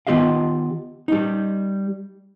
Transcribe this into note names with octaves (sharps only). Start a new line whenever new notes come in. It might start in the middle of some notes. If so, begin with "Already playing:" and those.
D#3 B3 F4 G4 D#5 F5
G3 D#4